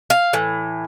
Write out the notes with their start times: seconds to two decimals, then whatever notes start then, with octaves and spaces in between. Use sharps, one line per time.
0.10 F5
0.33 A2 E3